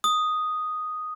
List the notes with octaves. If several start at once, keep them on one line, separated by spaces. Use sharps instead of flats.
D#6